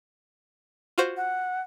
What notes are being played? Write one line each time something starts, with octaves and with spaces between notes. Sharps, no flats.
F4 F#4 C5
F#5